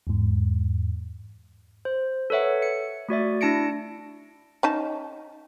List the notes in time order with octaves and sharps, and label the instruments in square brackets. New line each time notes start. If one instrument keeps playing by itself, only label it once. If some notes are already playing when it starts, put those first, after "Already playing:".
[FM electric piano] E2 G#2
[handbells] C5
A4 B4 C#5 E5 F#5
C#7
A3 F#4 D5 E5
D4 E4 A5 A#6 C#7 D7
[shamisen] C#4 D#4 A5